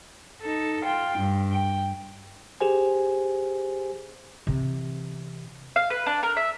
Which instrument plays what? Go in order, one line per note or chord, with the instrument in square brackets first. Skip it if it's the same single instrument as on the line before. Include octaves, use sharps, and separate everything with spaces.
[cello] D#4 A4
F4 G5
G2
G5
[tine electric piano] G4 G#4 C5 G#5
[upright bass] C3 E3
[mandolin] F5
B4
D4
A#4
E5